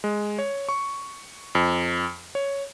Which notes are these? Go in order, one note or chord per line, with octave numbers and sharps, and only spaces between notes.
G#3
C#5
C#6
F2
C#5